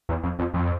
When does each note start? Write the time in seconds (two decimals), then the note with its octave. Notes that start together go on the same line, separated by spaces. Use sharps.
0.09 E2
0.23 F2
0.39 F2
0.54 F2